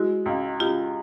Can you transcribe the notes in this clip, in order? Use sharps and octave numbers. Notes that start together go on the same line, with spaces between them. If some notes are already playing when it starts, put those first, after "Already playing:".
Already playing: G#3 E4 F#4
C#2
C#2 F4 G4